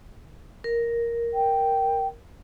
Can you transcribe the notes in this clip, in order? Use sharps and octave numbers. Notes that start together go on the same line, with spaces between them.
A#4
G5